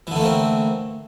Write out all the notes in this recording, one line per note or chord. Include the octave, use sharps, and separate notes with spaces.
D3 E3 A3 A#3 C4